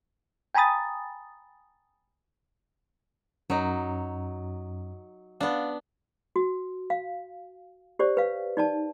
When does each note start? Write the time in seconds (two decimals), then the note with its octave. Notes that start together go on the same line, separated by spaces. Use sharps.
0.55 G5 G#5 A#5 B5 D#6 A6
3.50 F#2 F#3 D#4
5.41 B3 D4 F5
6.36 F#4
6.90 F5
7.99 G4 C5 D5
8.17 B4 F5
8.57 D#4 D5 A5